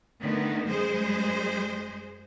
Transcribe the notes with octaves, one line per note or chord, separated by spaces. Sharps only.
D3 D#3 A3 B3
F#2 G#3 G#4 C5